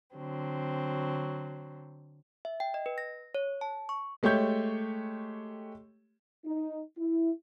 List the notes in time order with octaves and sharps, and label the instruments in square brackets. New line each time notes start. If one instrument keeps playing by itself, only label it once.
[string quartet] D3 F#3 C4
[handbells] E5
G5
D#5
B4
A#6
C#5
A5
C#6
[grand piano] G#3 A3 G4 C#5 G6
[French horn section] D#4
E4